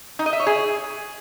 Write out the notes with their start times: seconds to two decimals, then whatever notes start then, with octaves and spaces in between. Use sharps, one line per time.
0.19 D#4
0.26 D#5
0.33 E5
0.40 C#5
0.46 G#4